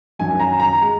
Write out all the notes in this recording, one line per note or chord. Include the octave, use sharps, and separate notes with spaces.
F#2 D#3 F#3 G#5
A#5
A#5
G#3